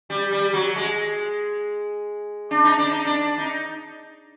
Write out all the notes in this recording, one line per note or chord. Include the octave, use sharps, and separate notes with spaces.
G3
G3
F#3
G#3
D4
D#4
D4
D#4
D4
D#4